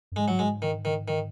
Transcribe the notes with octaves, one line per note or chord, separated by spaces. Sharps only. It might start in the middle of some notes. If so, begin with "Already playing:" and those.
F#2
G#2 G#3
F#3
G#3
D#3
D#3
D#3